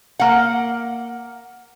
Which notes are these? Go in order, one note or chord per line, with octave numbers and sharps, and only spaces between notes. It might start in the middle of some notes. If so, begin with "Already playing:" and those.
A#3 F#5